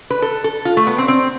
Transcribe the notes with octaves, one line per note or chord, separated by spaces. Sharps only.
B4
A4
A4
F4
A3
B3
C4
C4